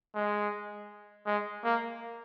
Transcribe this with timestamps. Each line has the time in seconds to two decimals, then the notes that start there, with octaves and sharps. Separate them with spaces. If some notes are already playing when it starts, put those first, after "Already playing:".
0.15 G#3
1.26 G#3
1.64 A#3